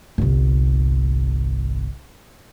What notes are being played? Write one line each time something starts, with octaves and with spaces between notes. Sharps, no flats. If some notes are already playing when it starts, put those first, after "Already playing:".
G1 C2